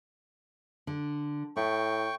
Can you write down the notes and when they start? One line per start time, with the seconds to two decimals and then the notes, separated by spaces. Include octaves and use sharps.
0.87 D3
1.57 A2 E4 G5 C#6